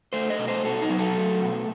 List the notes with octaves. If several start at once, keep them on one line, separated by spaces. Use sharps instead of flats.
A3 C5
D#5
B2
C5
B2 A4
D#4
F#3
A4
A3
B2